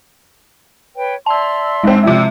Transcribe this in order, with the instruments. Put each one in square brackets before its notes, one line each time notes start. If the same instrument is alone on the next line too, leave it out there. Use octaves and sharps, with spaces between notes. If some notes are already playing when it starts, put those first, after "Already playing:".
[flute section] B4 C#5 G5
[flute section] D5 E5 C6 [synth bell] A5 E6
[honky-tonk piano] G#2 C4 [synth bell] G#3
[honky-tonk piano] C3 F3 E4 [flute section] D5 G5 E6